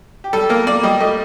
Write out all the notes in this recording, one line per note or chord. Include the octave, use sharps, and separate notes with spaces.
G4
G3 A4
A#3 A#4
A#3 D5
G3 D#5
A3 D#5